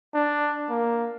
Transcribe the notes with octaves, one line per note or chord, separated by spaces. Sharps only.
D4
A#3